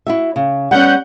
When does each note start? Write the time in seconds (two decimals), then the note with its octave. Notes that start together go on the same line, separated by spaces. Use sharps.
0.07 E4 F#4 E5
0.36 C#3
0.71 G3 B3 C#4 F#5 G6